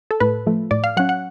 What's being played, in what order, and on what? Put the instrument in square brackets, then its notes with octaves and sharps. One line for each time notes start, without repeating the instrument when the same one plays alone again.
[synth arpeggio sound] A4
A2 B4
F3 A3
A2 D5
F5
F#3 C#4 F#5
F#5